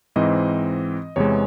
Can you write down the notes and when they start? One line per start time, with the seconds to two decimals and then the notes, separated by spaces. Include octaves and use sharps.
0.16 G#2 E3 C4 D#5
1.16 E2 C3 E3 G#3 C#5